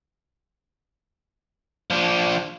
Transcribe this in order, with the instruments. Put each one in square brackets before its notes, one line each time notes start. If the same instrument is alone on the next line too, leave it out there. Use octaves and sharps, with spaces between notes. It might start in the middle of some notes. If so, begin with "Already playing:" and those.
[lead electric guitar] F3 D4